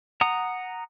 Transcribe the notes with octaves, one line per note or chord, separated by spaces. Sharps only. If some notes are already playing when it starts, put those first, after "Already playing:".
F#5 A#5 D#6